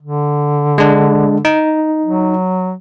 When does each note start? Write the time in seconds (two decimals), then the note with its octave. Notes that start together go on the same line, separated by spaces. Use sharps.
0.02 D3
0.78 G#3 D4
1.45 D#4
2.05 F#3